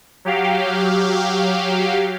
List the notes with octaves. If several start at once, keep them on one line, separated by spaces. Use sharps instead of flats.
F#3 G4 F5